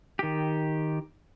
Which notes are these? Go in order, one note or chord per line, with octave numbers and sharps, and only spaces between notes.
D#3 G4